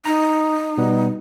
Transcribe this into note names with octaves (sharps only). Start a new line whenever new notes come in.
D#4 A#5
B2 G3 B3